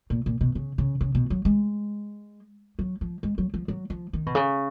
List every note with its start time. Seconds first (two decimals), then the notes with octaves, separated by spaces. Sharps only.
0.10 A#2
0.26 A#2
0.41 B2
0.55 C#3
0.78 C#3
1.01 C#3
1.15 B2
1.30 F#3
1.45 G#3
2.79 F#3
3.01 F3
3.23 G#3
3.38 F#3
3.54 F3
3.68 F#3
3.90 F3
4.13 D#3
4.26 B2
4.35 C#3